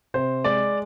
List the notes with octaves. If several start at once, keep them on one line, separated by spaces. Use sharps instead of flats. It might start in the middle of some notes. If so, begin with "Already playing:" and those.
C3 C5
G#3 D5